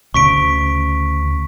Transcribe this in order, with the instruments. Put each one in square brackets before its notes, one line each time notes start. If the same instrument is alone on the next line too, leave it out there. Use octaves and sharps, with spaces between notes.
[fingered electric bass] D2 C#3 [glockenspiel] C#6 B6 D7